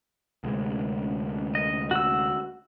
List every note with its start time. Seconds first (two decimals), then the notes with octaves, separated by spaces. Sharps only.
0.44 D2 C3 G#3
1.55 D#5
1.91 F#4 E6